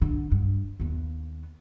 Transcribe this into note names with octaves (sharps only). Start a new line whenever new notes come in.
D3
G2
D#2 B3